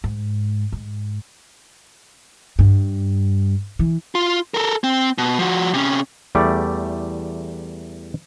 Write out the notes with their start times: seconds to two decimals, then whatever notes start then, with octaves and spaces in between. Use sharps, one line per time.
0.04 G#2
0.72 G#2
2.59 G2
3.79 E3
4.15 F4
4.54 A4 A#4
4.84 C4
5.18 B2
5.39 F3 F#4
5.74 C3 C#4
6.35 E2 G3 A3 D5